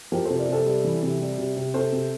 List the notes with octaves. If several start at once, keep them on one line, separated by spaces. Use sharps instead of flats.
F3 G4 A#4
C3 A4 C5
A#4 D5
C3 A4 C5
G3
E3
C3
G3
C3
C3
C3 A4 C5
C3